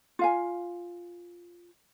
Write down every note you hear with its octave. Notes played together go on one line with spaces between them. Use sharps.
F4 F5 G#5